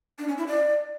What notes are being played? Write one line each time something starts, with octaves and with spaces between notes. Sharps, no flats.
D4
C#4
E4
D5